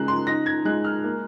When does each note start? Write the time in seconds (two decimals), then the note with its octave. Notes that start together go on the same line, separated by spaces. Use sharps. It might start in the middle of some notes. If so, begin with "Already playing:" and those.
Already playing: C#3 G#3 F#6
0.08 C6
0.27 D#4 A#6
0.46 G#6
0.65 G#3 F#6
0.84 F6
1.04 A#3